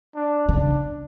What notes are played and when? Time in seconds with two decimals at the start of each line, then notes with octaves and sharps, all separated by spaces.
0.15 D4
0.49 C#3 D4